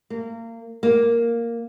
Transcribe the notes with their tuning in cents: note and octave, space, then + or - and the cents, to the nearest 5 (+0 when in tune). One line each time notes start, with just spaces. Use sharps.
A#3 -30
A#3 +0